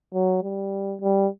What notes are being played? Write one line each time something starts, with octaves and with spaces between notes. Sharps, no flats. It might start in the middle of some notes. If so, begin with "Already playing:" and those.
F#3
G3
G3